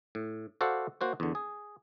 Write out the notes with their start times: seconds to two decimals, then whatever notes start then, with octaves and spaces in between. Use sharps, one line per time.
0.15 A2
0.61 F#4 A4 C5 D5 F5 F#5
1.01 A#3 F#4 C5 C#5
1.20 E2 D3
1.35 G#4